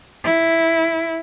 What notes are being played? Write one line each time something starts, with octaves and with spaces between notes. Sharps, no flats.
E4